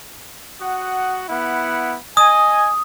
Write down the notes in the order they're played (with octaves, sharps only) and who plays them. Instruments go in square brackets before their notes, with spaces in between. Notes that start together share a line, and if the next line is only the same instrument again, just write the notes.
[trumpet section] F#4 F#5 D#6
B3 E4 F#5
[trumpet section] D#5 G#5 [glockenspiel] D#6